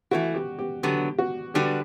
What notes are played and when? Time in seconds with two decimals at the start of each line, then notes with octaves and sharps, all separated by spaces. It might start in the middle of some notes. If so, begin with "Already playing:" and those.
0.11 E3 A3 E4 F#4
0.34 G4
0.59 G4
0.83 D3 F#3 B3 G4
1.18 F#4
1.54 D3 G3 D4 F#4 G4 B4